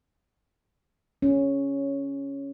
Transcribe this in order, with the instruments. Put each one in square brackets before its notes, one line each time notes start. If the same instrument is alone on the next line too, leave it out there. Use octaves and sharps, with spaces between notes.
[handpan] C#4